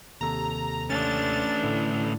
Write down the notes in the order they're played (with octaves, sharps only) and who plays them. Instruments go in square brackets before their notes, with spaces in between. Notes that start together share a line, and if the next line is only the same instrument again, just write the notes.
[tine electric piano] D#2 C3 A4 [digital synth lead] A#5
[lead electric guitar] A3 C#4 [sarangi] D4 [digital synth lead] A6
[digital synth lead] A2 [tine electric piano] D3